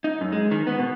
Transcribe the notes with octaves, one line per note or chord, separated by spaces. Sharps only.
D#4
F#2
G#3
D#3
B3
B2